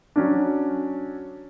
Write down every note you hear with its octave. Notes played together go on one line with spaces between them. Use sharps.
F#3 C#4 D4